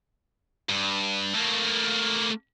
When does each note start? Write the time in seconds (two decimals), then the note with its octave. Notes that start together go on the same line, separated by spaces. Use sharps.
0.69 G2
1.35 A3 A#3